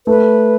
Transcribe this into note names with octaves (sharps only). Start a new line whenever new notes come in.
A3 B4